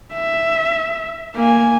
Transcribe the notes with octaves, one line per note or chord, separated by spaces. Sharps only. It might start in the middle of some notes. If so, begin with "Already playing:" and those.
E5
A#3 G#5